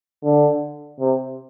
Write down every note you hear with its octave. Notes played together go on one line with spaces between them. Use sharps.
D3
C3